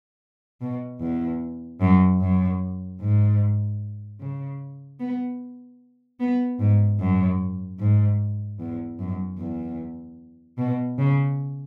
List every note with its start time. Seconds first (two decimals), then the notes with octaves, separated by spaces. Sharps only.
0.61 B2
1.01 E2
1.81 F#2
2.21 F#2
3.01 G#2
4.21 C#3
5.00 B3
6.20 B3
6.59 G#2
7.00 F#2
7.80 G#2
8.60 E2
8.99 F#2
9.39 E2
10.58 B2
10.98 C#3